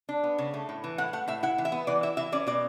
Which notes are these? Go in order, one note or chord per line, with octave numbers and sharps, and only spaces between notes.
D4
B3
C#3
A3
A2
E3
A2 F#5
A3 F#5
A2 E5
E4 F#5
E3
E5
B3
E3 D5
E4 E5
E3 E5
C#4 D5
B2 D5